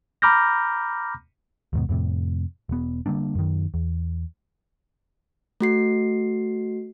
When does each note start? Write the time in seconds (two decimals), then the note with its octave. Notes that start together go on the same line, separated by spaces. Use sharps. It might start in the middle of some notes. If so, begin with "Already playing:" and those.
0.22 A#5 B5 D6 F6 G6 A#6
1.73 D#2 G#2 B2
1.89 F2 A2 C3
2.69 E1 B3
3.06 D3 G3 A#3 D4
3.35 F#2 D#3
3.74 E2
5.60 A3 F#4 C7